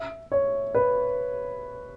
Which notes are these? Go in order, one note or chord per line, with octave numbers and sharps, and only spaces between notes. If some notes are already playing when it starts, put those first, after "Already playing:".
Already playing: E5
C#5
B4